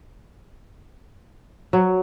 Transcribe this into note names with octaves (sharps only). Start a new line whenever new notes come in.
F#3